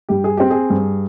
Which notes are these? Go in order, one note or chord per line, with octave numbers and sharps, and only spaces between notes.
G2 G4
G#4
C4 G4
G#4
G2